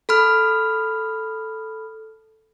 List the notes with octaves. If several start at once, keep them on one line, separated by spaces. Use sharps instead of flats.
A4 B5 F6